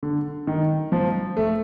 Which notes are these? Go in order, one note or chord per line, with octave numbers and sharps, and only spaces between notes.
D3
D#3
F3
A3